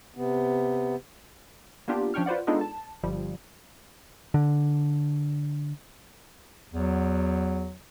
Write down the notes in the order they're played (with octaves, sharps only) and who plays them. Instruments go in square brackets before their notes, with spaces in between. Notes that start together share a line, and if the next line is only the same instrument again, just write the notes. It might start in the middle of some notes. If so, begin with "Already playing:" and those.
[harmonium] C3 B3
[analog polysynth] A#3 B3 D4 F4 G4
F3 C#4 D4 G5 C#6 F6
F4 B4 C5 D5 F#5
G#3 B3 D4 D#4 F4 A4
A5
G1 F3 G3
[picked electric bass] D3
[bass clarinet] E2 [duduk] F#3